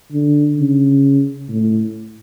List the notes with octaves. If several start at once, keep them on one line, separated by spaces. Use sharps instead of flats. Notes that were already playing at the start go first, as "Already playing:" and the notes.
D3
C#3
A2